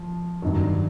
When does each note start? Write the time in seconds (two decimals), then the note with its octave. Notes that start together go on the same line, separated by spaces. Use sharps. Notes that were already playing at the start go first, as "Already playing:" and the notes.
Already playing: F3
0.42 G2 D#3 F#3